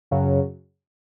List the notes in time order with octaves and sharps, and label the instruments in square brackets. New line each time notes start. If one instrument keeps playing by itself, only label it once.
[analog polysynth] F#2 C#3 F#3